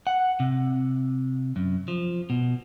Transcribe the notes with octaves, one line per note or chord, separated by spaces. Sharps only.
F#5
C3
F#2
F3
B2